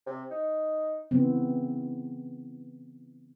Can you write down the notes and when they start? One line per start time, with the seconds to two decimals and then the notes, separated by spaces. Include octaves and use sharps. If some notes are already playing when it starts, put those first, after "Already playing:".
0.06 C3
0.30 D#4
1.11 C#3 E3 B3 C4